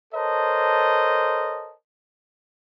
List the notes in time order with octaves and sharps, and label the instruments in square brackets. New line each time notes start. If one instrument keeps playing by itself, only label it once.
[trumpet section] A4 A#4 C5 C#5 D#5 A5